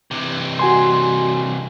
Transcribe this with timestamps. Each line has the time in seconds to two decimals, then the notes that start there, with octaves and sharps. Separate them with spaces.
0.11 C3 E3
0.59 F#4 G#5 C6